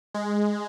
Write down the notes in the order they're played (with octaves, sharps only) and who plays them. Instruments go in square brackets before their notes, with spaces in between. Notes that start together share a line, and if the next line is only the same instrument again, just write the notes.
[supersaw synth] G#3